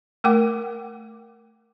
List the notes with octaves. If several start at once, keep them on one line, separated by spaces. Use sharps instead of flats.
A3 A#4 F#5 G5 D6